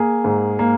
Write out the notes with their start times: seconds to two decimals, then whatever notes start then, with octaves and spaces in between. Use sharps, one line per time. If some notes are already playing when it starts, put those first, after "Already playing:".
Already playing: A#3 G#4
0.24 G#2
0.59 A#3